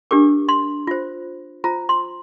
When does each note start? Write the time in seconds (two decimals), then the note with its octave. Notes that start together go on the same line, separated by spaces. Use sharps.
0.11 D4 G4 A#4 D6
0.49 C6
0.87 F4 C5
1.64 F4 C5 A#5
1.89 C6